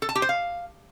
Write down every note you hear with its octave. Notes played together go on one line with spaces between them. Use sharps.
A4
A5
G4
C5
F5